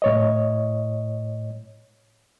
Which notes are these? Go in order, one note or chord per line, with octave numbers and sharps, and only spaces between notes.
A2 C#5 D#5